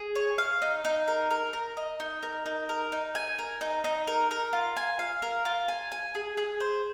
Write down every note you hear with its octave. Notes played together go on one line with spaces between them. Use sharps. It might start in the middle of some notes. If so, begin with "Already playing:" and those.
Already playing: G#4
C#5
F5
D#4
D#4
A#4
A#4
A#4
D#5
D#4
A#4
D#4
A#4
D#4
G#5
A#4
D#4
D#4
A#4
A#4
F4
G#5
F5
A#4
F4
G#5
G#5
G#4
G#4
C5